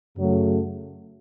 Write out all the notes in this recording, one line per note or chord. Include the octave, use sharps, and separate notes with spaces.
F#2 C#3 F#3 A3